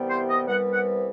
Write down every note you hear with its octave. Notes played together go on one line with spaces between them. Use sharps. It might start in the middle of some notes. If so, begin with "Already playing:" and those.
Already playing: C2 C3 E3 G3 B3
C5
D#5
C2 C3 E3 G3 B3 F#5
F#5